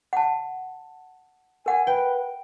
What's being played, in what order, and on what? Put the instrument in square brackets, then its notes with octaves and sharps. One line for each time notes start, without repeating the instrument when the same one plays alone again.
[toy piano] F#5 A5
[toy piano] A#4 F#5 [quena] G#5
[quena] B4 [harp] G5